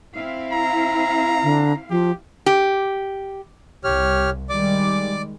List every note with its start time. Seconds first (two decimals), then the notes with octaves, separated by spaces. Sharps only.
0.15 C4 E4 F5
0.52 A#5
1.43 D3
1.90 F3 G4
2.46 G4
3.84 C2 G4 C#5 F6
4.49 D#3 G3 G#3 D5 D6